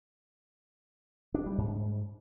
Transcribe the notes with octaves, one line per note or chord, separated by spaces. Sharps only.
D4
G3
G#2